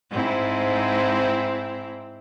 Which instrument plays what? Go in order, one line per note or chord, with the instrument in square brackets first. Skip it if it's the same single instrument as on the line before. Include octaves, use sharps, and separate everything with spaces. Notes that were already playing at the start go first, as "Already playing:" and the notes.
[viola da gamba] G#2 C4 E4